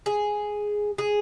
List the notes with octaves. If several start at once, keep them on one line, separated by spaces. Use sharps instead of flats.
G#4
G#4